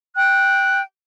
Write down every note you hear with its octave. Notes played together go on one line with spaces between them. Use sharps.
G5 F#6